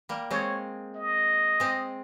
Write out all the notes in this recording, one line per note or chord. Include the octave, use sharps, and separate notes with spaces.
G3 A#3
G#3 C4 C#5
D#5
G#3 C4